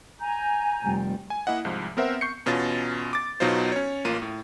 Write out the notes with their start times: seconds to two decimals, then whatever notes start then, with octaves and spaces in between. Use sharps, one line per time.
0.20 G#5 A#5 G6
0.84 F1 G3
1.30 G#5
1.47 A#3 E4 D#5 F#5
1.65 C2 G#2 F3
1.97 B3 C4 A#4 C5 E5 F#5
2.21 C#6 G6 C7 C#7
2.46 E2 B2 C#4 F4 A6
3.13 D6 A6
3.40 B1 B2 F#3 D#4 F4 C5
3.72 C#4 C#5
4.05 A1 A#3 F4 D#7
4.22 A2